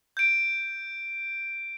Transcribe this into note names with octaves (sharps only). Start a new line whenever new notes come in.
G6 D7